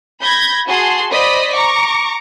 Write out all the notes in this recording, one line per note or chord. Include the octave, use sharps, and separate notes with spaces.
B5 G6 G#6 A#6
F#4 G#4 A5 C6
C5 D5 D#5 B5 D#6 B6
A#5 C#6 D6